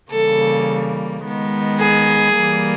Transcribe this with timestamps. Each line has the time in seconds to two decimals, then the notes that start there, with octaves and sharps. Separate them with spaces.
0.11 C#3 E3 G3 A#3 A4
1.23 D#3 G#3 B3
1.79 G#4
2.35 E3 G3 A#3